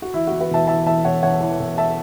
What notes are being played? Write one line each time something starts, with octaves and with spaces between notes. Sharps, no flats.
F#4
E3 E4
F#4
E2
F#4 B4
E1 E5 A5
E3 E5 A5
E2 E5 A5
E1 C#5 F#5
E1 C#5 F#5
E3
E1
E5 A5